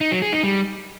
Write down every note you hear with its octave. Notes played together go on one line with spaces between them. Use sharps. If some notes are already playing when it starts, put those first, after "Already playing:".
D#4
F#3
G#4
D#4
G3